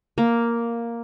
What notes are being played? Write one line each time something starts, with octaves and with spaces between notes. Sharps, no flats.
A#3